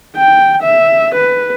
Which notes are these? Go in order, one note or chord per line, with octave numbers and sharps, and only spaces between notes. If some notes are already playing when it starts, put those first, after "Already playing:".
G5
E5
B4